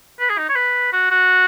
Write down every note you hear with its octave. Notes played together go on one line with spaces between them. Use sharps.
B4
G#4
D#4
C#5
B4
F#4
F#4